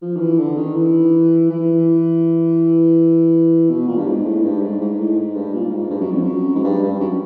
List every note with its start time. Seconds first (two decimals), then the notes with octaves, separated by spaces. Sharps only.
0.02 F3
0.16 D#3
0.20 E3
0.39 D3
0.57 D#3
0.75 E3
1.50 E3
3.69 B2
3.88 A#2
3.97 G2
4.07 G#2
4.25 A2
4.44 G2
4.61 G#2
4.81 G#2
4.99 A2
5.16 G#2
5.35 G2
5.53 A#2
5.71 G#2
5.90 G2
6.01 F#2
6.11 F2
6.21 F#2
6.55 G#2
6.64 G2
6.83 G2
7.00 F#2